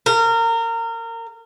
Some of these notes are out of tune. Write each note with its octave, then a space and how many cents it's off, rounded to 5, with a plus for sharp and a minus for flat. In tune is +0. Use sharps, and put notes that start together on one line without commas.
A#4 -25